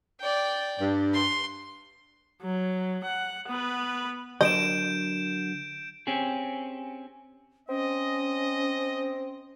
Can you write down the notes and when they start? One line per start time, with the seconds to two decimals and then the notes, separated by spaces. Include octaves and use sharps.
0.20 D5 G5
0.79 G2
1.14 C6
2.42 F#3
3.04 F#5
3.48 B3 B4
4.41 D3 F#3 A#4 D#5 G6 D7 E7
6.07 C4 C#4 G4 G#4
7.69 C4 C#4 D#5